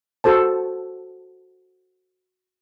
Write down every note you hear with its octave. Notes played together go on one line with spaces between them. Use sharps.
F#4 A4 C5 A5